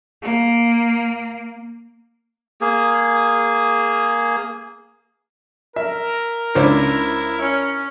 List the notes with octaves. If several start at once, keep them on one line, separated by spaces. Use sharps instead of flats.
A#3
A#3 G#4
A#4 E5
C#2 D4 E4 C5
C#4